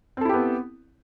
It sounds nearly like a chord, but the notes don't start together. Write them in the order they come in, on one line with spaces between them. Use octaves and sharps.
C4 A4 E4 G4 B3